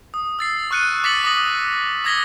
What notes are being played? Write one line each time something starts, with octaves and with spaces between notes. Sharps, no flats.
D#6
E6 A6 C7
C#6 F6 F#6 C#7 D#7
D6 A6 B6 C#7 F#7
D6 D#6 A#6 F#7
D6 D#6 G#6 A#6 B6 G7